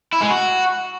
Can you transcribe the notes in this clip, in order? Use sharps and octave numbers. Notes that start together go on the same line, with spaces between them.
E4
G#3
F#4